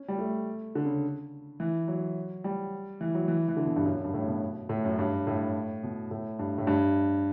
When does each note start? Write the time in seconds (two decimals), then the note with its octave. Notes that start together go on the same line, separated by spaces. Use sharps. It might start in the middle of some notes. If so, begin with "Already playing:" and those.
Already playing: C#4
0.08 G3
0.18 A3
0.75 D3
0.85 C#3
1.60 E3
1.88 F#3
2.44 G3
3.01 E3
3.15 F#3
3.28 E3
3.48 E3
3.57 D3
3.66 B2
3.76 G2
3.85 F#2
3.95 F#2
4.04 G2
4.14 A2
4.28 B2
4.69 A2
4.85 F#2
4.99 G2
5.27 A2
5.83 B2
6.11 A2
6.39 G2
6.58 A2
6.67 G2